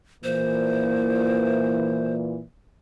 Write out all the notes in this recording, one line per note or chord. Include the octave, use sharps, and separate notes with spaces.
A#2 E3 A#3 C5